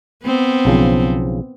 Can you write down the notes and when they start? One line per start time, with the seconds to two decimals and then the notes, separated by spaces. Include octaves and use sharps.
0.24 B3 C4
0.65 B1 C#3 F3